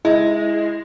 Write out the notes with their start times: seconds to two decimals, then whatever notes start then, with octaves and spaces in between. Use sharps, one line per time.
0.05 G#3 E4